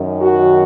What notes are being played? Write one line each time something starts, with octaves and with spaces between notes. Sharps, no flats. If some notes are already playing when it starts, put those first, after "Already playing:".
Already playing: F#2 D#3
F#4